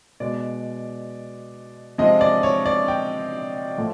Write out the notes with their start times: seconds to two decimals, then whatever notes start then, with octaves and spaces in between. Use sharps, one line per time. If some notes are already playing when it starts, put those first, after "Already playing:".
0.20 B2 G#3 D5
1.98 C3 F3 G#3 D#5
2.21 D5
2.43 C#5
2.66 D5
2.88 G5
3.78 A2 F3